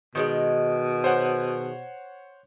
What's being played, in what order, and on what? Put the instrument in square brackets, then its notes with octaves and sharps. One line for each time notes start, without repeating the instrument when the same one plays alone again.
[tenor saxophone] B2 [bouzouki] D#3 G3 G#3
[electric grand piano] C5 C#5 F#5